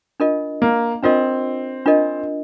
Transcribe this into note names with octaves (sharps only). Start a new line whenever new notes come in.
D4 F4 A#4 D#5
A#3
C4 D4 F4 A#4 D#5
D4 F4 A#4 D#5